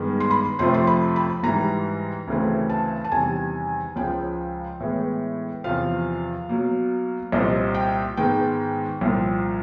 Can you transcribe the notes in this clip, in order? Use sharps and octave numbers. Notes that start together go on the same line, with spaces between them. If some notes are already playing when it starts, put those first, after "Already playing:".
Already playing: G2 D#3 G#3 B3
C6
B5
F2 C3 F3 A3 C4 C6
C6
B5
B5
G#2 E3 G3 A#5
D2 C#3 E3 A3 C4
A5
A5
E2 C3 D#3 G3 G#5
C#2 C#3 F3 G5
A2 E3 G#3 B3
E2 C3 F3 F5
B2 F#3 A#3
C2 A#2 G3 C4 D#5
G5
G#2 D#3 G#3 B3 G5
C2 A#2 F3